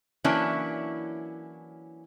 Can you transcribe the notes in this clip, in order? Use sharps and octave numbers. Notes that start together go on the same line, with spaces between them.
E3 F#3 A#3 C#4 D4 E4